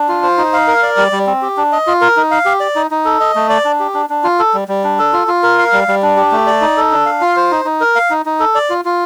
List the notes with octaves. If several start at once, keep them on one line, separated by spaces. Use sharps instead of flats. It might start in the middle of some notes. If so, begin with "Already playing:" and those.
Already playing: D4
F4
C5
D#4
F5
A#4
D5
G3
G3
C4
G4
D4
D#5
F4
A#4
D#4
F5
G4
D5
D#4
D#4
A4
D#5
A3
D5
D4
G4
D4
D4
F4
A4
G3
G3
D4
A4
F4
F4
A#4
F5
G3
G3
D4
G4
A3
D5
D#4
A4
D4
F5
F4
C5
D#4
D#4
A#4
F5
D#4
D#4
A4
D5
F4
F4